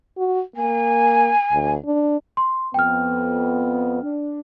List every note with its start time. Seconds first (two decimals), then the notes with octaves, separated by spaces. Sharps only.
0.17 F#4
0.56 A#3 G#5
1.52 D2
1.85 D4
2.37 C6
2.74 F2 B3 G5 F6
4.02 D4